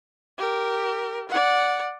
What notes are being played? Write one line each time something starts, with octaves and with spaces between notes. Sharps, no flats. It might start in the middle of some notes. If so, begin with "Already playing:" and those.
G4 A#4
D5 F#5